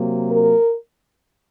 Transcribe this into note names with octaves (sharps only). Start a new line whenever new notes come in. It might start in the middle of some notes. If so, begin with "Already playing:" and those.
Already playing: C3 F#3 A#3
A#4